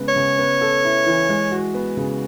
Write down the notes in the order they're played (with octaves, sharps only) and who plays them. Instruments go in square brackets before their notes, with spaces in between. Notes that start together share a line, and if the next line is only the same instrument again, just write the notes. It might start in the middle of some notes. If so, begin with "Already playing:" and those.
Already playing: [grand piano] C#3 G#3 B3
[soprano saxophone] C#5
[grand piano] C#3
B3
A4
E4
E3
G#3
F#4
B3
C#3